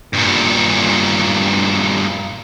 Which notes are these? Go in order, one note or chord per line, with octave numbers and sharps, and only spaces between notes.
G2 A#2